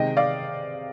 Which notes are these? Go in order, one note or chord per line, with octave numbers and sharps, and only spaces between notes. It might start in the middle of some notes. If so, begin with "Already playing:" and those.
Already playing: C3 D#3 G#3 D#5 G5
D5 F5